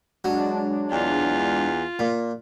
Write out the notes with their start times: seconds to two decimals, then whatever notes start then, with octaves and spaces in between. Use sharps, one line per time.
0.25 F#3 G#3 D4
0.92 E2 F4
1.99 A#2